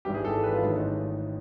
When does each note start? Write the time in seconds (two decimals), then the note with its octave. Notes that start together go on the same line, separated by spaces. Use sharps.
0.05 G#1 G#2 E3 G3 G4
0.14 G#4
0.25 A4
0.43 B4
0.53 F4
0.63 A1 G#2 D#3
0.72 D#4